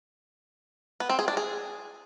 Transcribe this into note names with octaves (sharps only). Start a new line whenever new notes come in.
B3
C4
G#4
D4
G#4